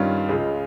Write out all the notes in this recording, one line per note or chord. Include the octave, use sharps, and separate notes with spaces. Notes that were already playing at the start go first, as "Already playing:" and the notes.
Already playing: G2 D#3 G3 C#4 F4
C#2 C#3 G#3